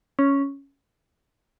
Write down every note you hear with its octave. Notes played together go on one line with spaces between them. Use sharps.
C#4